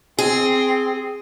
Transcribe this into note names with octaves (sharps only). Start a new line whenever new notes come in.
C4 G#4